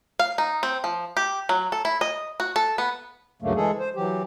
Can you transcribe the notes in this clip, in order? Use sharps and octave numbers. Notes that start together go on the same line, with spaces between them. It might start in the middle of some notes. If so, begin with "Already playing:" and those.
F5
D#4
C4
F3
G4
F#3
A4
E4
D#5
F#4
A4
B3
D2 G2 C#3 F#3 A3 A#3
E3 G#3 G#4 A4
C5
E3 F#3 G4